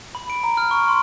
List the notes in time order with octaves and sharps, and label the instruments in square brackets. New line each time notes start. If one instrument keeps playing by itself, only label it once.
[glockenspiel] B5
D7
A#5
F6
C#6
C6